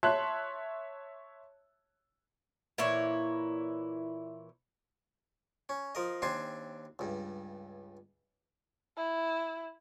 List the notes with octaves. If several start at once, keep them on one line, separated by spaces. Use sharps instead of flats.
C#5 E5 A5 C6 F#6
A#2 E3 E4 C#5
C#4
F3 A#4 D#5
D#2 C4 D4 G#5 A5 C6
C#2 G2
E4